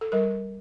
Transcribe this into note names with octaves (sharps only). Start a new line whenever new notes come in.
A4
G3 A#4